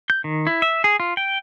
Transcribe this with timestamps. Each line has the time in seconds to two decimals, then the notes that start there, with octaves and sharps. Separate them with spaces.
0.10 G6
0.24 D#3
0.47 E4
0.62 E5
0.84 G#4
1.00 F4
1.17 G5